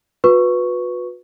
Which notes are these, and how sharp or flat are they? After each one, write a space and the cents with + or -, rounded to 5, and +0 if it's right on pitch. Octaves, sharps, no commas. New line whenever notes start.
F#4 -40 B4 +0 C#6 +0